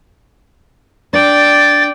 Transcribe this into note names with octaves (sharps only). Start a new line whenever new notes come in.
D4 D5 G5 A6